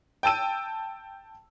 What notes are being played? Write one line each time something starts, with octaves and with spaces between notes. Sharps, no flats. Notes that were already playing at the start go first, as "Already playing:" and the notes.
G5 A5 E6 D#7